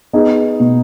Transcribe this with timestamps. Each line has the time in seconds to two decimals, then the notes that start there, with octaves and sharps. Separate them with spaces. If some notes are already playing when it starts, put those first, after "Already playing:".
0.13 B3 D#4 G#4
0.60 B2